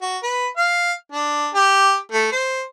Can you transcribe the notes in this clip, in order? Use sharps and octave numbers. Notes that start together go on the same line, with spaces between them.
F#4
B4
F5
D4
G4
A3
C5